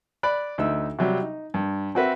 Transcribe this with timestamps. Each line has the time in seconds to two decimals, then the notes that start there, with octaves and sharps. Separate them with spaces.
0.23 D5 B5 F#6
0.58 D2 D#4 E5 E6
0.99 C3 F#3 G3
1.22 D#4
1.54 G2
1.95 C4 F#4 B4 E5